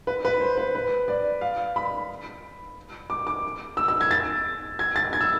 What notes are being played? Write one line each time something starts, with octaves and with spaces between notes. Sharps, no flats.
B4
B4
C5
B4
B4
D5
F5
B5
D6
D6
E6
E6
G#6
A6
G#6
A6
G#6
E6